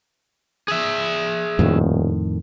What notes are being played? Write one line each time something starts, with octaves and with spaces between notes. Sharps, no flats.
G#4 E5
D#1 F2 A2 D#3